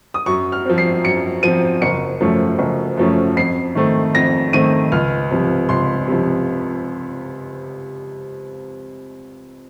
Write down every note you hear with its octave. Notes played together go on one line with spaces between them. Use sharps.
D#6
F#2 C#6
F6
F3 C4
C7
F#2 C#7
F3 C4 D#7
F#1 C#7
F#2 F3 A3 C#4
F#1
F#2 F3 A3 C#4
F2 C7
D#3 A3 C4
F2 A#6
D#3 A3 C4 D#7
C#2 F6
C3 F3
C#2 C6
C3 F3